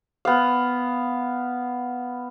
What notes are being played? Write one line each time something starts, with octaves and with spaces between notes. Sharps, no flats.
B3 F5